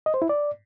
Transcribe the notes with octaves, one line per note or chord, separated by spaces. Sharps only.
D#5
C5
E4
D5